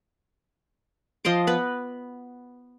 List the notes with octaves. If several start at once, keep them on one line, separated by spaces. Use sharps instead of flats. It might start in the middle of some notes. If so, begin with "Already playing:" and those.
F3 D#5 C6 D6
B3 B4